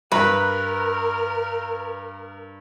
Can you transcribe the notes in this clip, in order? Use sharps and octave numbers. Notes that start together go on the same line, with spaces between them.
G2 A#4 B4 A#5